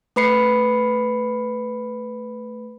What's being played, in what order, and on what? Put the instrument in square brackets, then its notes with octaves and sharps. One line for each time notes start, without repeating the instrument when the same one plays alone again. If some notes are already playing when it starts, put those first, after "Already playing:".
[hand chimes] A3 B4 B5 C7 C#7